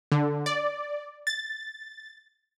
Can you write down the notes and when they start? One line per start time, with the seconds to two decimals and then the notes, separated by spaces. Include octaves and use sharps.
0.12 D3
0.46 D5
1.27 A6